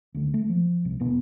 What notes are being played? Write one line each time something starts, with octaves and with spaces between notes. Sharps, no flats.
D2 A3
A3
F3
C2 C3
E1 B2 B3